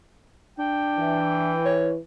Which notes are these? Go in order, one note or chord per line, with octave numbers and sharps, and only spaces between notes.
D4 G5
E3
C#5